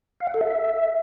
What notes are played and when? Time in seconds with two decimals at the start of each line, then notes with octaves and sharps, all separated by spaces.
0.20 F5
0.27 F#5
0.34 A4
0.41 E5